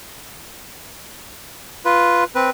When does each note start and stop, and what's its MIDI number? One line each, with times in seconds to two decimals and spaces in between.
1.85 2.24 65
1.85 2.24 71
2.35 2.50 60
2.35 2.50 71